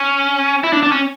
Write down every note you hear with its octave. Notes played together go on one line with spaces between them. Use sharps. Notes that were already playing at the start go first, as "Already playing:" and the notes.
Already playing: C#4
E4
D4
D4
C#4